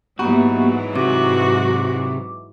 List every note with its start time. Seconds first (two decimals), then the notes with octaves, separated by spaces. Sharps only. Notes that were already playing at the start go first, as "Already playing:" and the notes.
0.19 G#2 E3 F#3 A#3 B3 F#4 G4
0.96 C3 F#4 D6